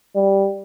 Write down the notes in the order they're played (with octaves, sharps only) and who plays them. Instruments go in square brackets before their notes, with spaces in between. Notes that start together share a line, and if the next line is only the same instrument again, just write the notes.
[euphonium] G3